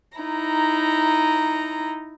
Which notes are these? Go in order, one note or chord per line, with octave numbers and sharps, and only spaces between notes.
D#4 E4 A#5